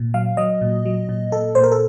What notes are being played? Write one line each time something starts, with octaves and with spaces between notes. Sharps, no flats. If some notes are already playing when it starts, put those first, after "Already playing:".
Already playing: A#2
F#3 F5
F#3 D#5
A#2
F#3
A#2
A#2 A4
A#2 C5
A#4
A4